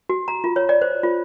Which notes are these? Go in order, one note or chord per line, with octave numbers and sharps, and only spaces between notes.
F#4
A#5
F4
C#5
D5
C5
F4